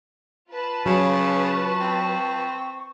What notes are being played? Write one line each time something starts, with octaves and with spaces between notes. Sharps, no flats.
F4 B4 A5
C#3 F#3 C#6
C4